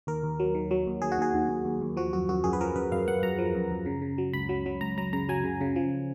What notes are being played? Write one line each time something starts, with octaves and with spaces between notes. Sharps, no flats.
D#2 A#4
D#2
F#3
D#3
F#3
D#2
D#2 G#4
F#4
D#2 G#4
D#2
D#2
D#2
D#2
F3 F#4
F#2 F#4
F#2 F#4
F#2 G#4
B4
F3 A#4
F#2 B4
F#2 F5
F#2 F#5
F#2 A#5
F3
F#2
F#2
C#3
C#3
F#3
C#2 B5
F#3
F#3
C#2 A#5
F#3 A#5
C#3 A#5
F#3 G#5
C#3
C#3
F3